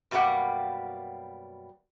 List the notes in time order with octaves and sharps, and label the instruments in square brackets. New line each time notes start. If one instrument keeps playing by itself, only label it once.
[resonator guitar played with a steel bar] F#2 B2 G3 A#3 G4 F#5